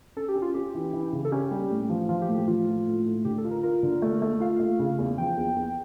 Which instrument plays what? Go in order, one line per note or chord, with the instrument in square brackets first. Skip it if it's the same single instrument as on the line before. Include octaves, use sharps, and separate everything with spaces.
[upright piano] C#4 [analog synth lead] A4
[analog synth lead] G4
[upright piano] C#4
[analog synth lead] F4
[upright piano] C#4 [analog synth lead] G4
[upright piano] E3
E3
C#3
[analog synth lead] A4
[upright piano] C#4 [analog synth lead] G4
[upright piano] G3
A2
F3
[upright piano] F3 [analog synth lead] F4
[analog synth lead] G4
[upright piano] A2
[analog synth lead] G4
[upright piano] F3 [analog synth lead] F4
[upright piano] A2
A2
A2
[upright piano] D3 [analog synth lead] G4
[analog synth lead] A4
[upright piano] F4
[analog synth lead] A#4
[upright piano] F4 [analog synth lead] A#4
[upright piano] D3
A3
A3
[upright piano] F4 [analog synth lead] F5
[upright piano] A3
C#3
E2
[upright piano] F3 [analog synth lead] G5
[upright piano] E2
E2